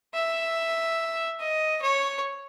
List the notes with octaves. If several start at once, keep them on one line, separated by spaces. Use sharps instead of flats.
E5
D#5
C#5